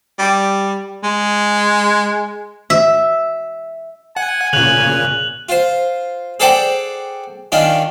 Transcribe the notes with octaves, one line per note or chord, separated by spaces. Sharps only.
G3
G#3
E5
F#5 G#5
A#2 C#3 F#6 F7 F#7
F4 C5
G#4 A4 C5 D5 F#5 G5
D#3 C#4 D4 F4